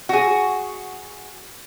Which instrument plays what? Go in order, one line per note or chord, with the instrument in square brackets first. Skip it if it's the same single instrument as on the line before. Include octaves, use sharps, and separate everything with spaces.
[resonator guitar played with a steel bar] F#4 G#4